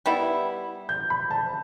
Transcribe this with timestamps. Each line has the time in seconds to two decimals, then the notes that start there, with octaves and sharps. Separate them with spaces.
0.06 G3 B3 E4
0.89 G6
1.10 B5
1.31 A5